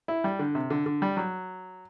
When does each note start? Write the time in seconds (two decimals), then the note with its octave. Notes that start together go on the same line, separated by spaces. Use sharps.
0.08 E4
0.24 G3
0.39 D3
0.55 C3
0.70 D3
0.86 D3
1.02 G3
1.17 F#3